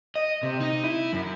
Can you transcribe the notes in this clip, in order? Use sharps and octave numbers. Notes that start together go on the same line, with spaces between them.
D#5
C3
D#4
E4
F#2